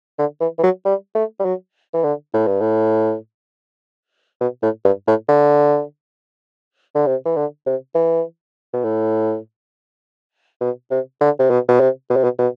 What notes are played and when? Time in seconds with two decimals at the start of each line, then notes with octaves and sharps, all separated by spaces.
0.19 D3
0.41 E3
0.59 E3
0.63 F#3
0.85 G3
1.15 A3
1.40 G3
1.45 F#3
1.94 E3
2.04 D3
2.34 A2
2.47 G2
2.61 A2
4.41 B2
4.63 A2
4.85 G2
5.07 A2
5.29 D3
6.95 D3
7.07 C3
7.26 E3
7.37 D3
7.66 C3
7.95 E3
8.73 B2
8.84 A2
10.61 B2
10.91 C3
11.21 D3
11.39 C3
11.50 B2
11.69 B2
11.80 C3
12.10 B2
12.17 C3
12.24 B2
12.39 B2